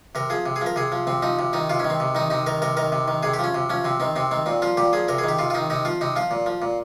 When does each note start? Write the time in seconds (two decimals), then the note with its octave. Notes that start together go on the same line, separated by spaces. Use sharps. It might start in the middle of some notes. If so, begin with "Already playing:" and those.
0.15 C3 A#4
0.30 F3 G#4
0.46 C3
0.56 G#4
0.61 F3 A#4
0.76 C3 G#4
0.92 F3
1.07 C3 C4
1.22 F3 D#4
1.39 C3
1.53 D#3 D#4
1.70 C3 F4
1.79 C#4
1.85 D#3
1.90 C4
2.00 C3
2.15 D#3 D#4
2.30 C3 D#4
2.47 D#3 A#4
2.62 C3 A#4
2.77 D#3 A#4
2.92 C3
3.08 D#3
3.23 C3 G#4
3.34 G4
3.39 F3 C#4
3.55 C3
3.70 F3 C#4
3.85 C3 C4
4.00 D#3 C4
4.16 C3 C4
4.31 D#3 C4
4.46 A#2 C4
4.62 F3 F4
4.77 A#2 G4
4.93 F3 G#4
5.08 C3 A#4
5.18 G#4
5.24 D#3 G4
5.39 C3 F4
5.50 F4
5.54 D#3 D#4
5.70 C3 D#4
5.85 F3 F4
6.01 C3 D#4
6.16 F3 F4
6.31 A#2
6.46 F3
6.62 A#2